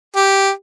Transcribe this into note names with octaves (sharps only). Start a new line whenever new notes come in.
G4